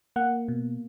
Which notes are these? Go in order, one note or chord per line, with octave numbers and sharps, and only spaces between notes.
A#3 F#5
B2